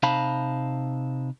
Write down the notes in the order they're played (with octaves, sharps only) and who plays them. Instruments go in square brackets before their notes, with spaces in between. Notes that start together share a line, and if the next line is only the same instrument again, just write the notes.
[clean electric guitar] C3 D#4 C5 F5 A5 B5